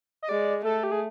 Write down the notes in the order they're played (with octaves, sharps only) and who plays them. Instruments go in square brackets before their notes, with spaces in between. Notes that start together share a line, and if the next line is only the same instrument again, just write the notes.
[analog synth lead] D#5
[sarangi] G#3 [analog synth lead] D5
[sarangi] A3 [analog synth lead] A4
[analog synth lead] G4
G#4